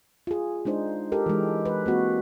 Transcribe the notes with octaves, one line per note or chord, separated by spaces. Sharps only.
F4 G#4
G#3 D4 D#4 C5
G4 A4 A#4
E3 G#3
B4
A#3 C4 F#4